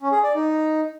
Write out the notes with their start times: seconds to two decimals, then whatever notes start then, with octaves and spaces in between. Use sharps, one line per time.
0.01 C#4
0.12 G#4
0.23 D5
0.35 D#4